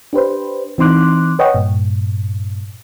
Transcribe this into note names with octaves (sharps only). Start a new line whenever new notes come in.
D4 G4 B4 C5
E3 C4 D#4 C6 D6 F#6
B4 C#5 D#5 F#5 G5 C#6
G2 A#2